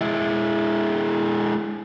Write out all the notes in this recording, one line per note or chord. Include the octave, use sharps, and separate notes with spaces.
G#3 E4